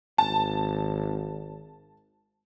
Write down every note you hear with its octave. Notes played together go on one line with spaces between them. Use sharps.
G#1 A5